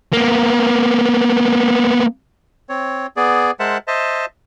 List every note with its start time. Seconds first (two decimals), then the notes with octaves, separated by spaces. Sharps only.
0.13 A#3 B3
2.69 C4 C#5
3.17 B3 G#4 D5
3.60 G#3 A#4 C5 E5 F#5 A5
3.87 C5 D#5 E5 A5